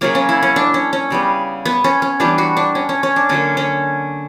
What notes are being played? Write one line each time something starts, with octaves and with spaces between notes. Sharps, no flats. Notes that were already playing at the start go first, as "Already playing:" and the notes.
C#3 F#3 A#3 C#4
C#4
E4
C#4
D4
C#4
C#4
C#3 G3 B3
B3
C#4
C#4
E3 G3 B3 D4
F#4
D4
C#4
C#4
C#4
D4
D3 F#3 A#3 C#4
C#4